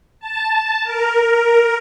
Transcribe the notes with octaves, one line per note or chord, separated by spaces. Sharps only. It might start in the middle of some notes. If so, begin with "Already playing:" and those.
A5
A#4